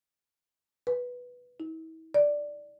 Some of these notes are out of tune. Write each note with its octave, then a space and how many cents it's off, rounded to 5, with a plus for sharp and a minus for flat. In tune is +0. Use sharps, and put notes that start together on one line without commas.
B4 -5
E4 -40
D5 +0